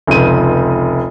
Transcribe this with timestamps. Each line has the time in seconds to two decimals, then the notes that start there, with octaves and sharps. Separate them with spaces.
0.07 F1 C#2 D#7